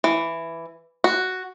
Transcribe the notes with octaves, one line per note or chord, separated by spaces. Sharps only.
E3
F#4